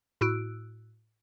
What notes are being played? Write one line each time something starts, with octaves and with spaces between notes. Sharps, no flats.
A2 E4 F#4 E6 F#6 D7